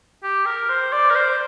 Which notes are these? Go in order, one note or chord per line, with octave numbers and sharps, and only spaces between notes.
G4
A#4
C5
D5
A#4
C5